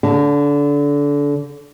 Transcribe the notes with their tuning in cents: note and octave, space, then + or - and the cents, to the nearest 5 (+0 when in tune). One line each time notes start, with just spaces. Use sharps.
D3 -25 A5 +20